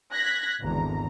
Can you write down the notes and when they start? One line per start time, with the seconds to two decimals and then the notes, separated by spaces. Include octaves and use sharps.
0.12 F#6 G#6 A#6 B6
0.61 G#1 E2 D3 A#5